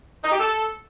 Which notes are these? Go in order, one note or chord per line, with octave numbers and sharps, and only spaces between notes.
D#4
G4
A4